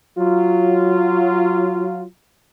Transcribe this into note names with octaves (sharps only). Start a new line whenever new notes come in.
F#3 F4